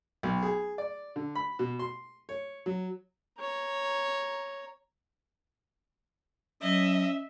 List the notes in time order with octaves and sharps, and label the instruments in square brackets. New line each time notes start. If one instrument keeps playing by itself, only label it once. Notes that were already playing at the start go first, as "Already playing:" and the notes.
[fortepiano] B1
G#4
D5
D3
B5
B2
C6
C#5
F#3
[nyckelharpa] C#5 A#5
[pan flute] F#3 [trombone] C#4 [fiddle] D#5 [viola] E5